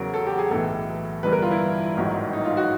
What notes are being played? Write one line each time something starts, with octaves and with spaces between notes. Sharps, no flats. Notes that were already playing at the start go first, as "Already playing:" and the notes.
Already playing: E2 C#3 F#3 A#4
A4
G4
G#4
B1 A2 E3 A4
G1 G2 E3 B4
A#4
F4
E4
A1 G#2 D#3 F#3
D#4
F4
F#4